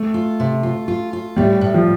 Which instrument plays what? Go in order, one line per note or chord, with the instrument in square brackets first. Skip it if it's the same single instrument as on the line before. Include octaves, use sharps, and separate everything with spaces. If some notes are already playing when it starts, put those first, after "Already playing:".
Already playing: [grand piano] A3
[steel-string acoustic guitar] F4
C3
F4
F4
F4
[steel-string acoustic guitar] A2 [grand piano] G3
[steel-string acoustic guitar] A2
[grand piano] F3